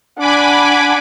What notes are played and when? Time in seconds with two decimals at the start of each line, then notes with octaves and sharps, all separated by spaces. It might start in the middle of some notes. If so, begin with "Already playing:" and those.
0.19 D4 F#5 G#5 B5 D6